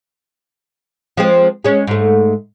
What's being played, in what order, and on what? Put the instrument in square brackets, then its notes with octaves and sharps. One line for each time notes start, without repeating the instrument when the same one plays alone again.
[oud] F3 G#3 C4
G#3 C#4
G#2 A3